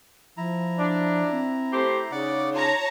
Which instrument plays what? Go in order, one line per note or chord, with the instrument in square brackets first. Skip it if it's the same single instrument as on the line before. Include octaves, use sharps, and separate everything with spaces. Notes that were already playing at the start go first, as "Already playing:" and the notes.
[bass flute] F3 [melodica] E4 A#5
[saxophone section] D4
[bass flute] C4
[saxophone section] A3 G4 C5
[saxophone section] C#3 [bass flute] D#4 [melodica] D5 F#5 D6
[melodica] F4 [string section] C#5 A5 A#5